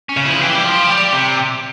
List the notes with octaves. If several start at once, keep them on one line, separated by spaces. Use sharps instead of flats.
C#4
C#3
F3 E4
E3 G4
G3
F3
G3
C3